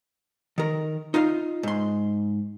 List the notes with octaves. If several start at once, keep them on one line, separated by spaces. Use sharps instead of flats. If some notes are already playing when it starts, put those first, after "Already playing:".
D#3 A#4
D#4 F4 D#5 F5
G#2 C6